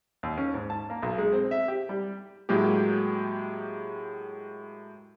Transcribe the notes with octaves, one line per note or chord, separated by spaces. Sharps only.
D#2
C#4
G#2
A5
A#3
B1
G#3
C4
E5
G4
G3
A2 F#3 G#3 A#3 G4